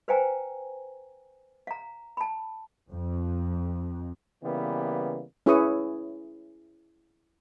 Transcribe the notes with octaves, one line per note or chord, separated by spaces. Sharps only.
B4 C5 F5 G5 G#5 A#5
F5 A#5
A5 B5
F2
C#3 E3 G3 A#3 B3
C#4 E4 G#4 B4 C#6 D#6